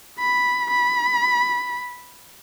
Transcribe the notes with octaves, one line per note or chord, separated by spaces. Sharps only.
B5
B5